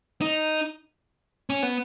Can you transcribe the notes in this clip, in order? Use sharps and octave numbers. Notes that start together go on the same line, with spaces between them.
D#4
C#4
B3